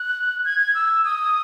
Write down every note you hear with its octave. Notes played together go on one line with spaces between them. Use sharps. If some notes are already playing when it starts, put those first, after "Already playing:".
Already playing: F#6
G#6
G#6
E6
D#6